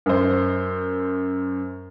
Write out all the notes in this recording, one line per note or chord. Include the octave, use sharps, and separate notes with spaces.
F#2 C5